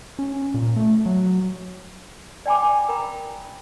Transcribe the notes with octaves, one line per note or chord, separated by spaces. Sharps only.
C#4
A#2
A3
F#3
D5 G5 G#5 B5 D6
A#4 G5 A#5 B5